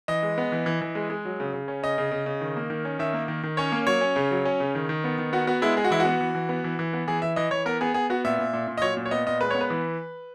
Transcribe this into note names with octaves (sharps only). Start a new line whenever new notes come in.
E3 D#5
G#3
B3
E3
E3
E3
G#3
G#3
F#3
C#3
C#3
C#4
C#3 D#5
C#3
C#3
C#3
D#3
A#3
D#3
C#4
D#3 E5
A#3
D#3
D#3
C#4 C#5
A#3
F#3 C#5
C#4
C#3
F#3
C#4
C#3
D#3
D#3
B3
D#3
B3 F#4
B3 F#4
G#3 E4
G#3 G#4
F#4
E3 E4
F#4
B3
E3
E3
B3
E3
E3
B3
E3 G#4
E3 E5
E3 D#5
E3 C#5
B3 A#4
B3 G#4
B3 G#4
B3 F#4
A#2 E5
A#2
A#2
A#2
D#5
F#3 C#5
A#2
C#5
B3 D#5
A#2 D#5
G#3 B4
B3 C#5
B4
E3